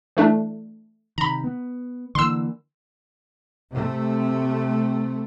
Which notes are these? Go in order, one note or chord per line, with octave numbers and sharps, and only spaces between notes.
E3 A3 D4
C3 D#3 A#5 B5
B3
D3 E3 A#3 C6 E6
C3 A3